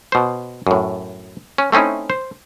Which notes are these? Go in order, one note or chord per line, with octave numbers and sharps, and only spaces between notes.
B2 C5
F#2 A2
C#4
A3 C4 C#4 D#4 E4
C5